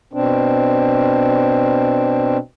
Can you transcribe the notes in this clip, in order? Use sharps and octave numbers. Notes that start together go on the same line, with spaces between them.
B2 C4 D4